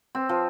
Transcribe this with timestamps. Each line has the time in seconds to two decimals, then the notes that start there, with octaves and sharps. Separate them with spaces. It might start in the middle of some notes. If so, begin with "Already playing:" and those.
0.15 C4
0.29 F3